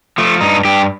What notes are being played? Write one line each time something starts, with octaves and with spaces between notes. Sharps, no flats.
F3 A3
G2 D#4
G2 G4